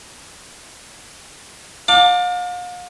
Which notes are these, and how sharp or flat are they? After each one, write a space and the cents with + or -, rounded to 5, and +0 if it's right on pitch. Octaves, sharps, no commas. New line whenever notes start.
F5 +40 A5 +35 D6 +5